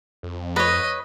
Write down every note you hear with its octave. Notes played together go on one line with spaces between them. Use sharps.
F2
B4 C#5 D#5